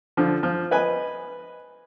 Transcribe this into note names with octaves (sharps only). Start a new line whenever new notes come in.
D3 F3
F3
B4 D#5 G#5